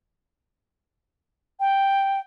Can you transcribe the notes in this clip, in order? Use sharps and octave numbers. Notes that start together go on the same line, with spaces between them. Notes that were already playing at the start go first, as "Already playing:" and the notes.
G5